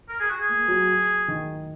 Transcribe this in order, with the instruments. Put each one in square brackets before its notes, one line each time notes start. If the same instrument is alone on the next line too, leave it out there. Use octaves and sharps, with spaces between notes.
[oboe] A#4
G#4
F#4
G#4
[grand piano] A#3
F#3
D#3